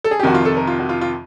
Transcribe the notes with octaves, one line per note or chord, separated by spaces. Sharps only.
A4
G#4
G4
F2 C3 D#3 F#4
F4
A4
A#4
F4
F#4
F4
F4